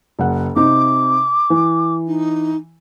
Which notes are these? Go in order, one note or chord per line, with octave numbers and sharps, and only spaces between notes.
F#1 F#5
C3 D#4 D6
E3
D#4